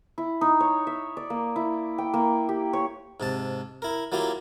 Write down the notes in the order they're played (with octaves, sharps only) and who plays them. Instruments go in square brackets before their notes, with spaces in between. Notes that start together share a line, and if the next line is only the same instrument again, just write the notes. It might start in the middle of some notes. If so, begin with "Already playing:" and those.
[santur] E4
D#4
C#5
E5
D5
A#3
E4
G5
A#3
G4
C#5
[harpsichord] G#2 C3 A5
E4 A#4
F#3 A#3 E4 F4 G4